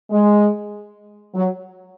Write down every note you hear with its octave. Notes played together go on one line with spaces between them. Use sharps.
G#3
F#3